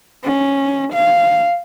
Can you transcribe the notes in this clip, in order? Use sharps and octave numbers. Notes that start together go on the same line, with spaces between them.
C#4
F5